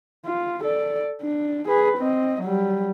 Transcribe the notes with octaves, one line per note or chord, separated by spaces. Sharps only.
F4
A4 D5
D4
G#4 B4
C4 D#5
F#3 G3